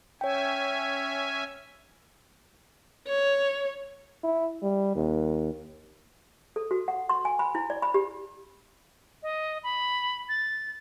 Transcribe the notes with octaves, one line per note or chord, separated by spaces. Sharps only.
C#4 C#5 E5 G5 G#5
C#5
E4
G3
D#2
A4
F#4
F#5
C6
G#5
B5
E4
D5
B5
G4
D#5
B5
A6